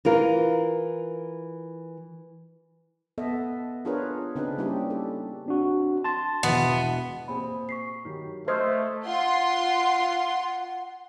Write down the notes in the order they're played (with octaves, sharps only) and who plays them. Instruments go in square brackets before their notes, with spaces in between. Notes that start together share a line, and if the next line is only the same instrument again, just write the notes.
[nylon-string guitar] E3 F4 A#4
[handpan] B3 A4 D#5 E5
D4 F4 G#4 A#4 B4 C#5
C#3 C4 D4 D#4 G#4 B4
G3 A#3 C#4 E4 G4
A4
[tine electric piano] C4 D4 F#4
[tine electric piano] A5 C6 A6 [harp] E7
[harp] E1 B2 E3 [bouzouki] B3
[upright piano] A#2 C4 G#4 [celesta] B5
[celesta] C#6 B6 C7
[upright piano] D#3 F#3 G4
[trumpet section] A3 [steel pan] C5 [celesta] D#5 C6 D#6 [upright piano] F6 G#6 C7
[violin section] F4 C6 [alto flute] F#5